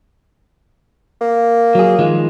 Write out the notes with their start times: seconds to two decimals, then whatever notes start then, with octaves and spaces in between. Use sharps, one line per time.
1.21 A#3
1.75 F#3 G#4
1.99 D#3 F3 G#3